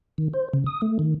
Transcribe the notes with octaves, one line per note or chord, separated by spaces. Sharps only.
D#3
C5
C#3
D#6
A3
D#3